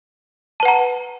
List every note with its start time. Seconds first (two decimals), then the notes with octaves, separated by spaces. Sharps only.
0.60 A5
0.63 B4
0.65 F#5
0.68 A#5